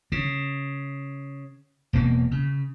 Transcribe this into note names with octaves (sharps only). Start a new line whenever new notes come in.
C#3
E1 B2 A#3
C#3